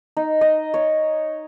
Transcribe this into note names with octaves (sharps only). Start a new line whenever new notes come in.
D#4
D#5
C#5